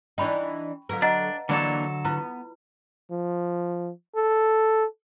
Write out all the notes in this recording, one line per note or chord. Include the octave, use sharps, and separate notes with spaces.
E3 D4 D#4 G5 B5 C#6
D3 F#3 A#4 B4 F5
D4 D#5 F#5 A#5
D3 E3 F#3 A#3 D4 A4
B3 E4 F4 B4
F3
A4